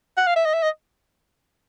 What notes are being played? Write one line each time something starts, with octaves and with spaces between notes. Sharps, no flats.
F#5
F5
E5
D#5
E5
D#5